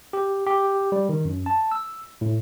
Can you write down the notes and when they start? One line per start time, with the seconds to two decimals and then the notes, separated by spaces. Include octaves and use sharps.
0.13 G4
0.47 G4
0.92 G3
1.09 D#3
1.25 F#2
1.46 A5
1.71 E6
2.21 A2